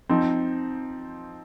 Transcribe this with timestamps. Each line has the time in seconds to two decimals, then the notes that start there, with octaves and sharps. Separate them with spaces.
0.09 F3 C4 D#4